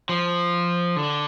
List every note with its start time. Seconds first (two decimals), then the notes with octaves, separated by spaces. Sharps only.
0.09 F3
0.96 D3